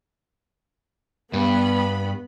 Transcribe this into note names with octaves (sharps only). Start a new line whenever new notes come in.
G2 B3 B5